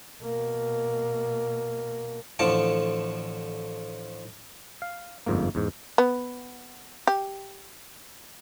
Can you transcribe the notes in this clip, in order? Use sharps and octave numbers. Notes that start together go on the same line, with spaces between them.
B2 A#3
A1 D3 F3 A5 C#6 D6
F5
G1 F2 G#2 A#3
E2 G#2
B3
G4